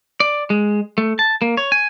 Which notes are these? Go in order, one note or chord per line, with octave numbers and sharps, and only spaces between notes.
D5
G#3
A3
A5
A#3
C#5
G#5